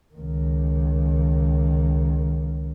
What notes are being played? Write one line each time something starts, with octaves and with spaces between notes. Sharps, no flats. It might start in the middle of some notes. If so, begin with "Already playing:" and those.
C#2 D#3